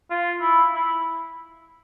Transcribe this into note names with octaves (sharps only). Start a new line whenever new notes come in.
F4
E4
E4